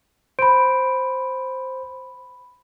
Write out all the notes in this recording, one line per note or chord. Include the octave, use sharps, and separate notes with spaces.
C5 B5 D7